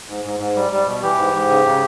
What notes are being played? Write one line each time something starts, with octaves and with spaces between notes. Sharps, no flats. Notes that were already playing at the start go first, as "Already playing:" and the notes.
G#2
G#2
G#2
G3
G3
B2
E3 G4
G#2
G#2
C#3
C#3